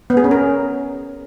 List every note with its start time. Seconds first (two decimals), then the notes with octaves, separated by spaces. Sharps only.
0.10 B3
0.17 G#4
0.24 C#4
0.31 A#4